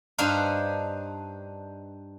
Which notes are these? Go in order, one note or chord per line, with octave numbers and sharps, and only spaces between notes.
G2 D4 D#4 B4 C5 F5